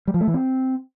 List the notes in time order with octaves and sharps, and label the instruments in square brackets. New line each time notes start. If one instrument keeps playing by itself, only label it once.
[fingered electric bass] G3
F3
A3
E3
C4